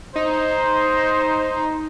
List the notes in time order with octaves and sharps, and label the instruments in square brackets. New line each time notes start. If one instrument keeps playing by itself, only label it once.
[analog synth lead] D#4 [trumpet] C5